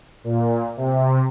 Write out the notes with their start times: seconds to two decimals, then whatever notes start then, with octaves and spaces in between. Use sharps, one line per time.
0.24 A#2
0.77 C3